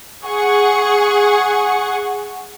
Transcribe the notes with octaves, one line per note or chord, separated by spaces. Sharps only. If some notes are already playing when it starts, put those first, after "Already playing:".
G#4 F#5 C#6